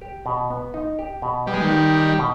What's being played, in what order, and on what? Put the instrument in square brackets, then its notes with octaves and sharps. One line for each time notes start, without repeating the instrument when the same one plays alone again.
[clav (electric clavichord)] G4
B2
B3
D#4
G4
B2
[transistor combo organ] G3 [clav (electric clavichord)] B3
[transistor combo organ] G#3
D#3 G3
[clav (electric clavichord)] D#4
G4
B2